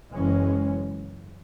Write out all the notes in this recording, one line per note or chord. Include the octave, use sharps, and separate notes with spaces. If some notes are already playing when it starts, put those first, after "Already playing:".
F#1 F#2 E3 G#3 C#4